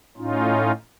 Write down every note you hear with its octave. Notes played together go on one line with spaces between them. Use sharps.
A2 C#4 D#4 F4